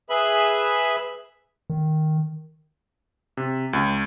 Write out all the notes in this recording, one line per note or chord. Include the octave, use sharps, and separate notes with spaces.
G#4 B4 E5 B5
D#3
C3
C#2